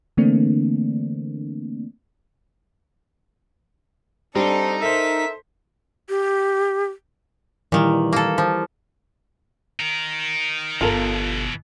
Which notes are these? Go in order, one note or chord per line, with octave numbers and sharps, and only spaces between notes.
D3 E3 A3 A#3 C4 D4
G3 C4 D4 D#4 A4
A4 A#4 C5 E5 B6
G4
A#2 D#3 E3 G3
A#3 A4
F3
D#4 A#4
G1 B2 E3 F4 A4 A#4